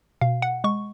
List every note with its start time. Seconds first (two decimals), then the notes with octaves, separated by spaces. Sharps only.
0.21 B2 F5
0.42 F#5
0.64 G#3 C#6